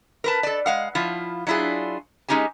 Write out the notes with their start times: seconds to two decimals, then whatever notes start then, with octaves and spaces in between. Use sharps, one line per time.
0.24 A#4 B4 A5
0.43 A4 D5
0.66 G#3 F5 F#5
0.95 F3 E4 F4
1.47 F#3 D4 E4 F4 G#4
2.28 G#3 C#4 D#4 G4 G#5